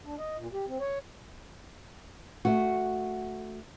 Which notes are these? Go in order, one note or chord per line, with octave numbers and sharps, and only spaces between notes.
D4
D#5
A#2
G4
C4
C#5
A3 F#4